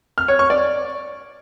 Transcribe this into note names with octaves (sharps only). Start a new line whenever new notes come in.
F6
C#5
C#6
D5